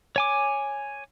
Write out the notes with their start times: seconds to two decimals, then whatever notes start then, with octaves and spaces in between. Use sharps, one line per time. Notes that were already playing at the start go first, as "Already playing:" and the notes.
0.16 C#5 G#5 D6